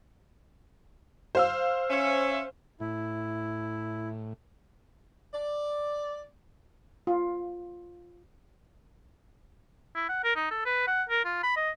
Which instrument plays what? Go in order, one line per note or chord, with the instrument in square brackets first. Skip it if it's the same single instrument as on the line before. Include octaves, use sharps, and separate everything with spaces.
[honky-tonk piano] C5 F5 E6
[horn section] C#4 E5
[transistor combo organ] A2 [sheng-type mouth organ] E4
[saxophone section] D5
[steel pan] F4
[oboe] E4
F#5
A#4
D#4
A4
B4
F#5
A#4
F4
B5
D#5